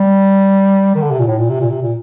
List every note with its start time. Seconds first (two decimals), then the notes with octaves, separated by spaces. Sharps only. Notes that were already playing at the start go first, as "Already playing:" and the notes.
Already playing: G3
0.95 D#3
1.02 D3
1.11 C3
1.19 A#2
1.27 A2
1.38 A#2
1.49 C3
1.60 A#2
1.70 C3
1.82 A#2